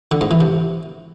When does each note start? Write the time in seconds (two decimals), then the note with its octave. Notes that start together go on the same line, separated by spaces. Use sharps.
0.11 D3
0.21 G#2
0.31 E3
0.40 C3